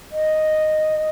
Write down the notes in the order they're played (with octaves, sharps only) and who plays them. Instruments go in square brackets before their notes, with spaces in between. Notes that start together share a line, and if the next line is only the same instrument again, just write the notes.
[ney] D#5